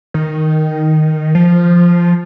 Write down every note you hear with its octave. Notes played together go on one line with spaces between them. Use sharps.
D#3
F3